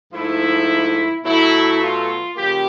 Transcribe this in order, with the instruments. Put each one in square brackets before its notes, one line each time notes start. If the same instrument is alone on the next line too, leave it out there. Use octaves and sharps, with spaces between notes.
[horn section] G#2 F3 A3 E4
B2 F#3 A3 E4
F4
C#3 F3 A#3 G4